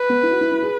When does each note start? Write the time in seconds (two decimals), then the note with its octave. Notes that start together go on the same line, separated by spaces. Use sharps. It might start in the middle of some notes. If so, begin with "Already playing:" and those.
Already playing: B4
0.10 B3
0.23 E4
0.31 F#4
0.41 E4
0.52 E4
0.62 G#4